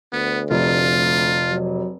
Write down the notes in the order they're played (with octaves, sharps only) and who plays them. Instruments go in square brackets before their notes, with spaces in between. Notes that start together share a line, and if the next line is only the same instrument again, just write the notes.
[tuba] D2 [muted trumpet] B3
[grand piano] F1 [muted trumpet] F4
[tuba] F#3